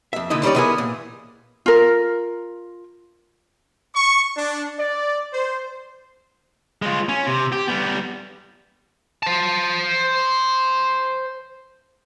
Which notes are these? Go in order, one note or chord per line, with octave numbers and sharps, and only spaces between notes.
F2 E5
A#2 D3 D#4 E4 D#5
D#3 G3 C#4 D#4 C#5 D5
E3 G#3 B3 E4 A#4 G#5
A#2
F4 A#4
C#6
D4
D5
C5
G#3 F4
C#4
C3
G4
G3 B3
C5 A5